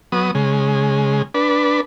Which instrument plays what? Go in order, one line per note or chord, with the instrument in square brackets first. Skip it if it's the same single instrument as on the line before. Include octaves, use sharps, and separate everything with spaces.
[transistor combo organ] F#3 B3 D#6
C#3 G#3
D4 B4